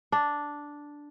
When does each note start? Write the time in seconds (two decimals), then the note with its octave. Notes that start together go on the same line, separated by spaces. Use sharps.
0.12 D4